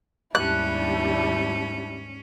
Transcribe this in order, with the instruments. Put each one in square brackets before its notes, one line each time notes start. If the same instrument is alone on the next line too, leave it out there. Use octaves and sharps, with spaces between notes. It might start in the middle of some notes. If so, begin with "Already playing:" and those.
[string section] D#2 G3 D4 [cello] G#2 C#4 [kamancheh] E4 [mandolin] F#6